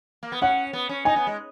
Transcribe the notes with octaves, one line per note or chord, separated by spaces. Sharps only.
A#3
B3
C#4 F#5
B3
C#4
D#4 G#5
B3
G#3